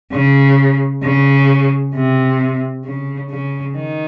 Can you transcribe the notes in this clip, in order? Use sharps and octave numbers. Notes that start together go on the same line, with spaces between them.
C#3
C#3
C3
C#3
C#3
D#3